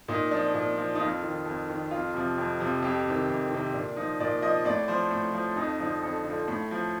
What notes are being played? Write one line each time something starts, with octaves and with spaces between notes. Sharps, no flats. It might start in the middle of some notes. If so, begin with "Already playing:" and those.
A#2 D#4
F3 D4
A#2
F3
D#4
F2 F4
D#3
F2
D#3
F2 F4
C3 F3
F2
C3 F3
F2 G4
C3 D#3
F2
C3 D#3
A#2 D4
F3 D#4
A#2 D5
F3 D#5
A2 D5
F3 C5
A2
F3
F2 D#4
D3 F3 D#4
F2 A4
D3 F3
A2
F3